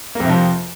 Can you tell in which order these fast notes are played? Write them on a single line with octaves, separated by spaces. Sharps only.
A#3 F2 C3 F3